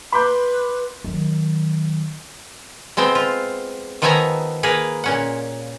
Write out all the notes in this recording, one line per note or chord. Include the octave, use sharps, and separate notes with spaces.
B4 B5 C6 D6 G6
D#3 F#3
G#3 B3 C4 C5
F4
D#3 F3 B3 E5 G#5 A#5
A#3 G#4 A#4 B4
A#2 C#4 F#5